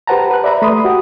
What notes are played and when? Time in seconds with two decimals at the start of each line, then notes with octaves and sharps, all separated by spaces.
0.07 G4 B4 C5 F#5 A5 A#5
0.31 B4 F#6
0.44 D5 E5 A#5 B5
0.62 A3 B5 C6 D#6
0.85 F#4 G4 F#5